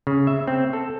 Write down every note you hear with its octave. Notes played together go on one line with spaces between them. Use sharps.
C#3
E5
C4
A4